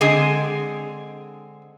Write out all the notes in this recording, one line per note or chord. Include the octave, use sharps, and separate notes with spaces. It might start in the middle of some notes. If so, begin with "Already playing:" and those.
D3 G#3 C4 G#4